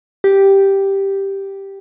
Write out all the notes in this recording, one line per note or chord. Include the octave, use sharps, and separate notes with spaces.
G4